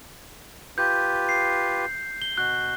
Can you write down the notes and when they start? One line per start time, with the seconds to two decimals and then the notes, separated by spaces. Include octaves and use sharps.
0.78 F4 G4 B4 G6
1.29 C7
2.22 G7
2.38 B2 F#4 F#6